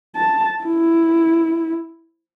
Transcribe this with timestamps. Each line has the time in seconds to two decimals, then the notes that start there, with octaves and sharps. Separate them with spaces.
0.16 A5
0.64 E4